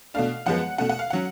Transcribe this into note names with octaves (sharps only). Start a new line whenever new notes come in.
B2 A3 D4 F5
F#2 F3 G#3 B3 F#5
B2 A3 C#4 F#5
F#5
F5
F#3 C#4 F#5